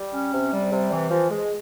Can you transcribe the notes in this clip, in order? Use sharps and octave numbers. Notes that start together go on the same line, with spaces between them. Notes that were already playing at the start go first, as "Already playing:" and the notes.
Already playing: G3
C#4
C3
G3
C3
E3
F3
G#3